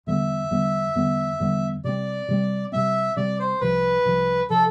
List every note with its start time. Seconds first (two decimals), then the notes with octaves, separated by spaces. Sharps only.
0.07 E2 D3 G3 B3 E5
0.51 E2 D3 G3 B3
0.95 E2 D3 G3 B3
1.40 E2 D3 G3 B3
1.84 C3 G3 C4 D5
2.28 C3 G3 C4
2.72 C3 G3 C4 E5
3.16 C3 G3 C4 D5
3.40 C5
3.61 C2 C3 F3 B4
4.05 C2 C3 F3
4.50 C3 F3 A4